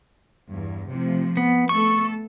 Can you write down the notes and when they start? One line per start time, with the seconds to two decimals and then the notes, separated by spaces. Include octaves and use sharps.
0.51 E2 G2
0.90 C3 F3 A3
1.37 B3
1.69 A3 B3 A4 C#6